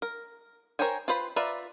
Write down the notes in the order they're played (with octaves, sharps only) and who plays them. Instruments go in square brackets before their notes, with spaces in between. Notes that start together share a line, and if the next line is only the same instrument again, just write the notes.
[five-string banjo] A#4
A#4 C5 C#5 G5 G#5
F4 B4 C5 B5
F4 A#4 B4 D5 E5